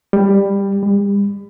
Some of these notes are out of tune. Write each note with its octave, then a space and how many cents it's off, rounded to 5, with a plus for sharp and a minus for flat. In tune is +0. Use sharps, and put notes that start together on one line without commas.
G3 +15
G3 +40